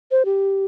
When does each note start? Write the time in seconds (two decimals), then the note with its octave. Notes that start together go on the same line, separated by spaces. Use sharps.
0.11 C5
0.25 G4